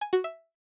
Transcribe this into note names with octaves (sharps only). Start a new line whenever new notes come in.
G#5
F#4
E5